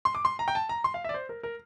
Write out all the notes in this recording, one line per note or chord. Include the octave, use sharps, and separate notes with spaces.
C6
D6
C6
A#5
G5
A5
A#5
C6
F5
E5
D5
C5
A#4
A#4